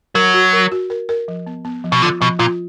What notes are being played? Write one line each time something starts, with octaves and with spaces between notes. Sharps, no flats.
F#3 A#4
F#4
A#4
F#4
A#4
A#4
F3
B3
B3
F3
B2
D3 F4
B2 F3
A#2 F4